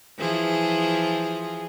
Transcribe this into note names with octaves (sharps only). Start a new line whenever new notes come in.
E3 F3 G#4